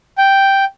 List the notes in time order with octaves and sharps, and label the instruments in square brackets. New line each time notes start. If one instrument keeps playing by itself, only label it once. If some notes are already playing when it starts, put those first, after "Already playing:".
[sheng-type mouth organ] G5